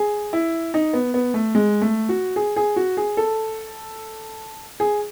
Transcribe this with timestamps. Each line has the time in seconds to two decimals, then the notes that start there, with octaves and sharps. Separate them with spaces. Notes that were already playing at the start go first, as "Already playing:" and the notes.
Already playing: G#4
0.33 E4
0.74 D#4
0.93 B3
1.14 B3
1.34 A3
1.55 G#3
1.81 A3
2.09 F#4
2.36 G#4
2.56 G#4
2.76 F#4
2.97 G#4
3.17 A4
4.80 G#4